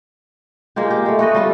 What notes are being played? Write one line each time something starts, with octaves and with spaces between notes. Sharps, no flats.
G#3 A#3 F4 G4
G4
G#3 A3
A3 B3 F#4 D#5
G3 F4 A4